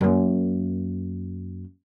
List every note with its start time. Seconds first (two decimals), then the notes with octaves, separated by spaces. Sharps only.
0.01 F#2 A#3